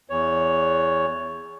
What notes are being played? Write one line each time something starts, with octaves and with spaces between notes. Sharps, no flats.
E2 C#5